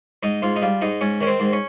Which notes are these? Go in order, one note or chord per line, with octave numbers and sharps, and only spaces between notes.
G#2 D#4
G#2 F4
D#4
G3 F4
G#2 D#4
G#2 C#4
D#3 C#4
C4
G#2
C#4